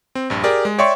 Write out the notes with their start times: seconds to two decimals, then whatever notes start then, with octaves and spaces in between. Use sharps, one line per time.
0.15 C4
0.30 A#1 G2
0.44 G4 G#4 A#4 D5
0.65 G#3
0.78 C#5 D5 E5 G5 C6 C#6